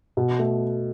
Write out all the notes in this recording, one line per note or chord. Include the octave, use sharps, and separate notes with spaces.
B2
A3